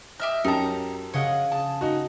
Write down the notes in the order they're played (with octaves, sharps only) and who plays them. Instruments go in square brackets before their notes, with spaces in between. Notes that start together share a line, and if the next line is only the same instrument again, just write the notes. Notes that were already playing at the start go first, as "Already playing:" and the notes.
[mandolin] G4 E5 F6 [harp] D#5
[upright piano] F#2 G4 A5 [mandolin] D#4 A#5
[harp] C#3 F5 D7 [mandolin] C#5 D#5 F#5
[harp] G#4 [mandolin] A5
[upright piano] D#4 F#4